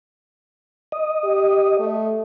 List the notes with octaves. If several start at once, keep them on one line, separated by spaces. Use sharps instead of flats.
D#5
G4
A3